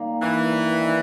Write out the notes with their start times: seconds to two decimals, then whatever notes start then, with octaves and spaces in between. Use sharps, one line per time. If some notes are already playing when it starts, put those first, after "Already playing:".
Already playing: D#3 G3 A#3
0.22 G2 E3
0.52 G3
0.83 D#3